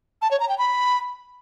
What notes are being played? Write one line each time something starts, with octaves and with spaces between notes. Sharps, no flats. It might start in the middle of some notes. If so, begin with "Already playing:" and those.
A5
C#5
A#5
G5
B5